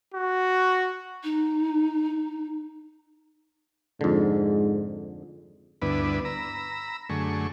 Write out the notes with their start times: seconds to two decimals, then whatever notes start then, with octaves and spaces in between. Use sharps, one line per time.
0.14 F#4
1.24 D#4
4.01 F2 G#2 D3
5.82 D2 G2 B3 D4 E4 B4
6.25 A#5 B5 E6
7.09 F#2 D3 A3 G#4 C#6